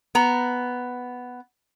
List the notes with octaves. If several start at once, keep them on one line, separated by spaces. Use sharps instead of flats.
B3 A#5